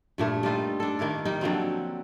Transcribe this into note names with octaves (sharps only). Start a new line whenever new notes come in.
G2 A#2 A3
G3 D#4 F4 A4
D4 A4
D#3 A#3 E4 A#4
G3 D#4
D3 F3 F#3 C4